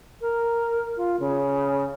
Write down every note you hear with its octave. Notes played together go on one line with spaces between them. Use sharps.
A#4
F4
C#3